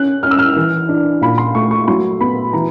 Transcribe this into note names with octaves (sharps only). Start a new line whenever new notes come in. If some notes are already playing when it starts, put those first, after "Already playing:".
Already playing: C#4 F#6
C#4 F6
E6
F6
E3
D4
A#2 B5
C6
A3 C#6
C#6
F#3 C6
B3 B5
E3 A#5